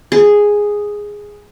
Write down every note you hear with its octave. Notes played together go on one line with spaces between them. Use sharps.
G#4